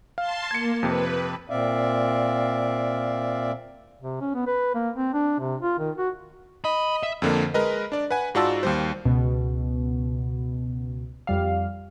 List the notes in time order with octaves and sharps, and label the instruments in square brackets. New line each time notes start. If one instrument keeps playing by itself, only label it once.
[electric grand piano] F5 [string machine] A5 C6
[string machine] A#3 [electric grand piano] G#6 C#7
[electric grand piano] F2 C3 [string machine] B4
[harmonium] A#2 C4 D5 E5 F5
[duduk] C3
C#4
B3
B4
A#3
C4
D4
C3
F4
D#3
F#4
[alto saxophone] D#5 [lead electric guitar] B5
[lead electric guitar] E5
[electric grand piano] F2 D3 A#3
G#3 A#4 B4 D#5
D4 D5
B4 F#5 G#5
G#2 F4 F#4 D5 A5 E6
D#2 G3 C5
[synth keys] C#2 B2
F2 G3 F5